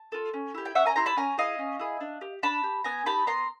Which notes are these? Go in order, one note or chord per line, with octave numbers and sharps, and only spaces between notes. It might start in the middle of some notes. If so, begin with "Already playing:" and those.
Already playing: A5
F4 A4
C#4
E4 G4
G5
C#4 E5 F#5
G#5 A#5
E4 G4 A#5 C6
A5 B5
C#4 G#5 A#5
E4 G#4 D#5 F5
C#4
E4 G#4
D4
G4
D4 A5 B5
G4
B3 G#5 A#5
D#4 G4 A5 B5
B3 A#5 C6